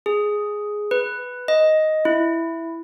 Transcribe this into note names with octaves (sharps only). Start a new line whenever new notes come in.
G#4
B4
D#5
E4